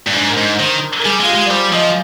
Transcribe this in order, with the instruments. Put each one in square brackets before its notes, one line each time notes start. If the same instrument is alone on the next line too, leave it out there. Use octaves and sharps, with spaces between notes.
[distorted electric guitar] G2
[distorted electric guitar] G#2 [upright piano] D4
[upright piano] A#4
[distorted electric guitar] G#2 [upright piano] C5
[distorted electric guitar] D#3 [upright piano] C5
[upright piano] A#4
[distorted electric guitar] G3 [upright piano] G#4
[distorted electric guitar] G#3 [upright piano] F4
[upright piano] G4
[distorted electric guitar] G#3
[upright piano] D5
[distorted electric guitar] G3 [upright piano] C5
[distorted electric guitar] F3 [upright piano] D#5